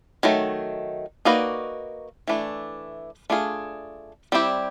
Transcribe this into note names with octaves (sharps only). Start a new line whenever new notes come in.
D#3 F#3 A3
A#3 D#4 F#4 B4 D5
E3 A3 D4
A3 D4 F4 G#4
G3 C4 E4 G4